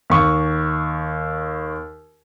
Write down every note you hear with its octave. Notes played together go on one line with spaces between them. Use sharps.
D#2 C#6